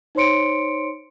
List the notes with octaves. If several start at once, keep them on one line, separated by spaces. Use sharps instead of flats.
D#4 C5 C#5 C6 C#7 D7